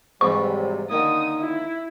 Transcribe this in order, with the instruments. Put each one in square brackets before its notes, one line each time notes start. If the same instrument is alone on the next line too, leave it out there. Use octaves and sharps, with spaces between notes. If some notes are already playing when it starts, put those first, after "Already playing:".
[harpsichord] F2 G#2 E3 [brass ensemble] C3 F#3 G3 [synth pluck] C#6
[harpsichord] D3 D#3 A#3 [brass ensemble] D#4 [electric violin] D#6
[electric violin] E4